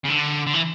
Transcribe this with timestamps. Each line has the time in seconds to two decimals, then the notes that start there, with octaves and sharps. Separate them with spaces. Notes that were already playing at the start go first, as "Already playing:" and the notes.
0.05 C#3
0.10 D3
0.47 D3
0.54 E3